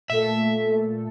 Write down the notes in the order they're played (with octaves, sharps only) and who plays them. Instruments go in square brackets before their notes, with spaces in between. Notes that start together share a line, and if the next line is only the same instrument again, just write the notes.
[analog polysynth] A#2 A3 A4 [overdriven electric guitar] E5